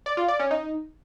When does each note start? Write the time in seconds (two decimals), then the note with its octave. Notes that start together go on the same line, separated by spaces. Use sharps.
0.06 D5
0.17 F4
0.28 D5
0.40 C#4
0.51 D#4